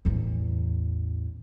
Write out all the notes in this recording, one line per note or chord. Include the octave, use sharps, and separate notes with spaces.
A1 E2